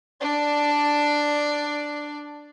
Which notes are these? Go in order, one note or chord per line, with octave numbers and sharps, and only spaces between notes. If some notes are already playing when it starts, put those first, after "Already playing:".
D4 D5